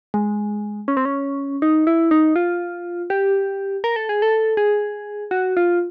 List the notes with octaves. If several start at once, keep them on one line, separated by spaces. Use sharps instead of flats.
G#3
C#4
C4
C#4
D#4
E4
D#4
F4
G4
A#4
A4
G#4
A4
G#4
F#4
F4